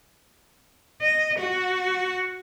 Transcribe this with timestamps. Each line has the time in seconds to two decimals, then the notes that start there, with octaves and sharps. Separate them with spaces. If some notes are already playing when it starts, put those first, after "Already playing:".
1.01 D#5
1.38 F#4